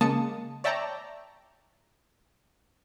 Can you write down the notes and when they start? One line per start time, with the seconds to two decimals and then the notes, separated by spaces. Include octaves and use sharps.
0.01 C#3 G#3 A#3 A5 D#6 C#7
0.64 C#5 D5 E5 G5 A5 A#5